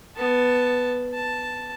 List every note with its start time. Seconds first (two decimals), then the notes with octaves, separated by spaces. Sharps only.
0.17 B3 A5
1.13 A5